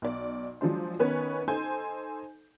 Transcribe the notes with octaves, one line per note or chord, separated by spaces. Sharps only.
B1 D5
F3 F#3 G#3 D4 C5
D#3 B3 C#4 B4 C#5
D#4 A4 C5 G#5 G6